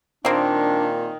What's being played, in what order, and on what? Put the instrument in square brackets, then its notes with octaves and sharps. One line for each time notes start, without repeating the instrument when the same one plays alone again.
[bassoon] A#2 [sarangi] D#3 [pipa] A#3 C4 [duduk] D4